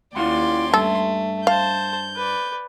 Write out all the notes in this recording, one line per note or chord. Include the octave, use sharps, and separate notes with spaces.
D#2 C#4 E4 F4 D5 F#5 G5 C6
G2 A3 A4
C5 F5 A5 G6
B4 D5